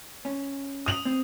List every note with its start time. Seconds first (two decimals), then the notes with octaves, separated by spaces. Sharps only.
0.25 C#4
0.86 D#6 F7 F#7
1.05 C4